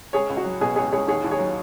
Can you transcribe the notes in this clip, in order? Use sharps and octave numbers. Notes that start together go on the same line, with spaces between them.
C#2 G#4 C#5
C#2
F#4
F#3
B2 G#4
C#2 G#4 C#5
C#2 G#4 C#5
D#2 G#4 C#5
D#2
G#4 C#5
F#3